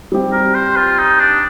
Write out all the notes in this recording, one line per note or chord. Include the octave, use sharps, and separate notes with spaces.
G3 C4 G4
A#4
C5
F4
D#4
D4